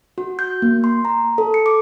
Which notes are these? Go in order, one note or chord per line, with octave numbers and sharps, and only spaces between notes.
F#4
G6
A#3
C6
A#5
A4
C#7
D6